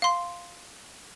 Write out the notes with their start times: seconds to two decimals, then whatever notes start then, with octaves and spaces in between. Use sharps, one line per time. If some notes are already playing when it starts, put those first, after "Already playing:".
0.02 F5 C6